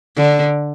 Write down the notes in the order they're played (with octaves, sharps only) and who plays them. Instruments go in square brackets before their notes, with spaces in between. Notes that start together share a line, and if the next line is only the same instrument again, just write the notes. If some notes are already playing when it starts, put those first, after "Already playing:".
[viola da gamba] D3